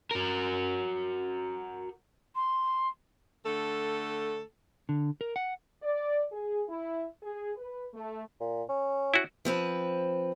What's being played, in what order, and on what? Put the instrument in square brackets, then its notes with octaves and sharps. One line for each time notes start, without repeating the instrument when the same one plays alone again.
[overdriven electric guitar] F#4 A#4
[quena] C6
[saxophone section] D3 A3 A4
[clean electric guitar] D3
A#4
F#5
[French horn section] D5
G#4
E4
G#4
B4
A3
[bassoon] A#2
C#4
[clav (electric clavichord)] E4 F#4
[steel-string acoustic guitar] F3 C4 B4